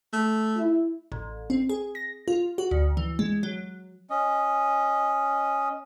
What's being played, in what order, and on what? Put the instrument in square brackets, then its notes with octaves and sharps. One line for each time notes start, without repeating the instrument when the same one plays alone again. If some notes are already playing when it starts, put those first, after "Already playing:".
[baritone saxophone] A3
[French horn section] E4
[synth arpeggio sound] A1
C4
G#4
A#6
F4
F#4
D2
E3
G#3
F#3
[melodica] C#4 D#5